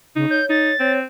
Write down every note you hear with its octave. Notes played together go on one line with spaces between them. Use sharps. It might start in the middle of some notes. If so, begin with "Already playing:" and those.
C#3 D#4
C#5 G6
D#4 A6
C4 C#5